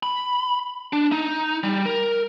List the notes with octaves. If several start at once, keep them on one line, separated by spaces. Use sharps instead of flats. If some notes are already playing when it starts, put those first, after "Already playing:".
B5
D4
D#4
G3
A#4